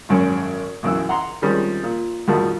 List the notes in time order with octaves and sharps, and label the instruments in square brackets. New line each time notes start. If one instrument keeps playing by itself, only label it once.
[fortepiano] G#1 F#2 C#4
B1 F#2 B2 E3 E6
F#5 A#5 C6
D#3 F3 G3 G#3 C4 C#4
A#2
A1 F2 B2 D#3 G3 A5